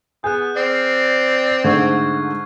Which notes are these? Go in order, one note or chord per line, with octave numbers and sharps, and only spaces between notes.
B3 G#4 F#6 G6
C4 D5 F6 C7
G#2 D3 A3 C#6 G#6